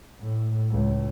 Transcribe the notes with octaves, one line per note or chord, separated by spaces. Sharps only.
A2
C#2